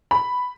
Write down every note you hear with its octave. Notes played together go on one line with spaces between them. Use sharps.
B5